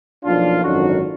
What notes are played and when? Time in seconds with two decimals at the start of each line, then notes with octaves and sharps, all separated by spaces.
0.24 B1 A#2 F3 D4 F4
0.63 G#1 F#2 D3 D#4 F#4